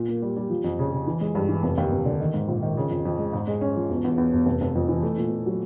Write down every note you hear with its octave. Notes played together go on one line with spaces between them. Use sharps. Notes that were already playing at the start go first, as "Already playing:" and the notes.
Already playing: A#2
A#3
G3
G3
F3
F2
C#3
C#3
E3
G#3
G2
E3
F1
D#2
F1
D3
D#3
G#2
A#1
D#3
C#3
F2
F2
G#3
G#2
G#3
C#4
F3
E1
E2
E2
E1
F1
F1
F2
E3
A3
A#2
A#2
F#3